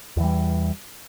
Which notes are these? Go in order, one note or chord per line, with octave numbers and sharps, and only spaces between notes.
E2 E3 G3